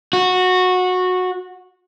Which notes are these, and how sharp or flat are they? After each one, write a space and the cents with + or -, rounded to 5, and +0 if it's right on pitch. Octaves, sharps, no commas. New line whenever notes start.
F#4 -15